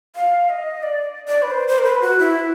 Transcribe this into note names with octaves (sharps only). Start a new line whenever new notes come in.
F5
D#5
D5
D5
B4
C5
C5
A#4
B4
F#4
E4